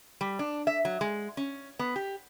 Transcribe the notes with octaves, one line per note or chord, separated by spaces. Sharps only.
G3
D4
E5
F#3
G#3
C#4
B3
G4